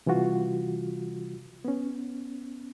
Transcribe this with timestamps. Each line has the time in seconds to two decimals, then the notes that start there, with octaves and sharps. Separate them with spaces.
0.06 C3 E3 G3 F4 F#4
1.65 B3 C#4